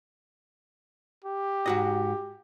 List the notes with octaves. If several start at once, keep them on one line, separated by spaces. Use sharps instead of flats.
G4
G#2 F#4 D#5